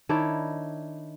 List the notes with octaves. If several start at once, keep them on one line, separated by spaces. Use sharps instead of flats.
D#3 D4 E4 C#5